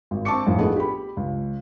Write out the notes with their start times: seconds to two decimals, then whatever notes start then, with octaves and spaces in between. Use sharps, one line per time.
0.11 G#1
0.25 C4 A5 C#6 D6 C#7
0.47 A1 F2
0.58 A3 B3 D#4 G#4 A4
0.76 G4 B5
1.17 C#2